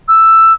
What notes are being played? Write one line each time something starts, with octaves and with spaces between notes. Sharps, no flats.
E6